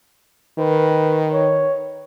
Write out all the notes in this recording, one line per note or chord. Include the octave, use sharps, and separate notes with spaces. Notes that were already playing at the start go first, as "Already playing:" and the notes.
D#3 B4
C#5